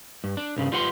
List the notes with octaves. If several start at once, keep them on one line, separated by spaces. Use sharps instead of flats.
G2
D4
C2 G2 C#3
G3 F4 B4 F#5 C6